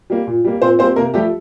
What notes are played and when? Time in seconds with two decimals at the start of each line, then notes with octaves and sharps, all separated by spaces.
0.10 G3 A#3
0.27 A#2
0.45 G3 A#3
0.62 A#2 C4 C5
0.79 G3 A#3 C4 C5
0.96 C3 A#3 A#4
1.14 F3 G3 A3 G4